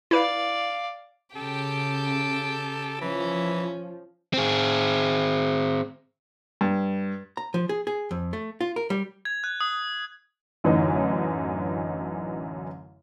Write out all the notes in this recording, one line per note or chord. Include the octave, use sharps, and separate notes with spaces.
E4 B4 D5 F5
C#3 G4 A4 G5
E3 F3 C#4
C4 G#4
G2
A#5
F3
G#4
G#4
F2
A3
F4
A#4
G3
G#6
F#6
D#6
A1 F#2 D3 E3 C#4 D#4